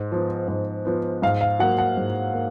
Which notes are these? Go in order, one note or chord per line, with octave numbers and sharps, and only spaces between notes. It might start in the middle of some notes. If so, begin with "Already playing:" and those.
Already playing: G#2
F3 B3
G#2
F3 B3
G#2 F5
F5
F#3 A#3 F#5
F#5
G#2
A#3